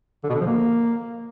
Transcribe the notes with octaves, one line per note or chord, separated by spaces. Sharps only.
D3
B2
D3
F3
A#3